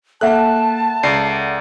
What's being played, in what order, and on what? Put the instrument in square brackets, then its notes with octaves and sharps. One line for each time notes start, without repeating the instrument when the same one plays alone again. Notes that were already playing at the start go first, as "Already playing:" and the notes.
[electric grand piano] A#3 F#6 [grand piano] A4 E5 F#5 [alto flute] A5
[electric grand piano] C#2 D5 C7